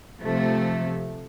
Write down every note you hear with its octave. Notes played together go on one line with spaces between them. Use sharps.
C3 F3 A3